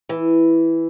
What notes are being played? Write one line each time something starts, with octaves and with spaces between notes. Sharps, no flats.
E3